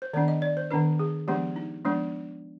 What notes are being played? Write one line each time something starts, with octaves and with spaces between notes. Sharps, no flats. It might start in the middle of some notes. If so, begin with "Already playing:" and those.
C5
D#3 B3 D4 D5
D#5
D5
C5
D#3 B3 D4 B4
G#4
F3 G#3 B3 D4 G4
D#4
F3 G#3 B3 D4